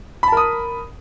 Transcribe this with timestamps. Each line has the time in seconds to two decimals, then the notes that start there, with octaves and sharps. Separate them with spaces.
0.23 B5
0.28 A5
0.32 A#4
0.37 D#6